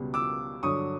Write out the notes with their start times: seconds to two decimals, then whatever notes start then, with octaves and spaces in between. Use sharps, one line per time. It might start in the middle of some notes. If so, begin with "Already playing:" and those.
Already playing: C#2 B2 G3 B3
0.14 D6 E6
0.63 G2 D3 F#3 C#6 D#6